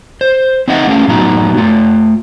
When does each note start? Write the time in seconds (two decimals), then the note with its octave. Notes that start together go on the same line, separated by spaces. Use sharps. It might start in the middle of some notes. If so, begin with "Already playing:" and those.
0.21 C5
0.68 C4 D#4 D#5 E5 F#5
0.87 A3 C#4 G#4 F5
1.08 A2 F#3 B3 D#4 F#4 A#5
1.57 A3 F4